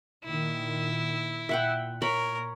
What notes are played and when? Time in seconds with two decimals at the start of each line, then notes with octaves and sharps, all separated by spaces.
0.24 A#2 D#3 E4
1.49 A#2 E5 F#5 G5
2.02 A#4 C#5 B5